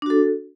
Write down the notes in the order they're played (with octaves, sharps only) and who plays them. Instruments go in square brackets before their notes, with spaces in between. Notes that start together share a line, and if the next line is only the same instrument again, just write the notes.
[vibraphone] D4
F#4
A4